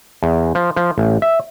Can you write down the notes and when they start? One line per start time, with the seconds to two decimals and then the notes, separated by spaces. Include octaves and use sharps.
0.23 E2
0.55 F3
0.76 F3
0.98 A1
1.22 E5